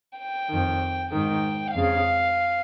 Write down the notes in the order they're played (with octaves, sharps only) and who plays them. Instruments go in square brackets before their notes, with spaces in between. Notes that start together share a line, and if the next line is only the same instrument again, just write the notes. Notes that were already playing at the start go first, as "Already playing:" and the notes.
[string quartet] G5
F2 D#3
G#2 D#3 G5
F2 C#3 F5